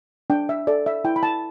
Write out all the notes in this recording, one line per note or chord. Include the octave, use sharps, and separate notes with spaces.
D4 G5
E5
A4 D5
E5
E4 G5
B5
A5